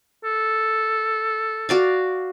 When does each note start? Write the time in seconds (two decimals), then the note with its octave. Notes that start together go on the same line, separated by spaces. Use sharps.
0.24 A4
1.69 F#4 D5 F5